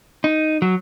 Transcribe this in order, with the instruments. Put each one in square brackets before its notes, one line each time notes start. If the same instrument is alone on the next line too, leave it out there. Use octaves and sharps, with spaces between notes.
[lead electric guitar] D#4
F#3